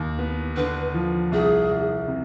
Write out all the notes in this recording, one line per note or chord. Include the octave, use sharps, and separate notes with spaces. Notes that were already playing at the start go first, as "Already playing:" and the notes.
Already playing: D#2
B3
D3 B4
F3
C2 G#4
C2
C3